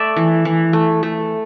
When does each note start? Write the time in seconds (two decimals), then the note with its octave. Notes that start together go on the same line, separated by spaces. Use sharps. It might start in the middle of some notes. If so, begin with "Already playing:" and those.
Already playing: A3 D5 E5
0.16 E3
0.45 E3
0.73 A3
1.03 A3